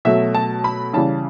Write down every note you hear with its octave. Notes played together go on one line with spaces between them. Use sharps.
B2 F#3 A3 E5
A5
B5
C#3 E3 G3 A5